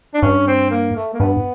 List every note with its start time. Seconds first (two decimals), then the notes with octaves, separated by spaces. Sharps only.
0.14 D4
0.22 G2 C#4
0.47 C4
0.70 A#3
0.96 A3
1.14 A#3
1.20 G2 B3